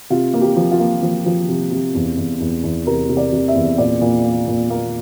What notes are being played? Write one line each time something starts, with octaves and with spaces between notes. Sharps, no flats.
C3 F4
A#3
G4
F3
F4
A#3
F3
F3
C3
C3
E2
E2
E2
E2
C3 A#4
C3
D5
C3
E5
E2
A#2 D5
A#2
A#3
A#2
A#3